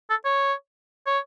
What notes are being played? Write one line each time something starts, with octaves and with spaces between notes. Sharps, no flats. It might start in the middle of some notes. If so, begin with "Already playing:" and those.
A4
C#5
C#5